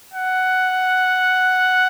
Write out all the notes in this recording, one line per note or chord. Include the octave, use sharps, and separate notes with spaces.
F#5